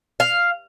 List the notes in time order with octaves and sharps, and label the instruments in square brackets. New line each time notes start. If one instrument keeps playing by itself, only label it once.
[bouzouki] F5